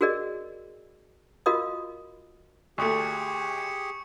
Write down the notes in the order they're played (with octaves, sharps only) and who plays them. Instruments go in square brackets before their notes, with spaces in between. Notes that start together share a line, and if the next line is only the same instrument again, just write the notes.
[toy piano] F#4 G#4 A#4 D5 D#5
F4 F#4 A#4 D#5 F5 D#6
[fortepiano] D2 A3 [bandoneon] G4 G#4 [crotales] C#6 D#6 C#7
[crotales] C#7